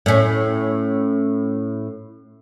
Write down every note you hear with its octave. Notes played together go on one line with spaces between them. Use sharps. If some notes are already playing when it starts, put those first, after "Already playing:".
A2 C#4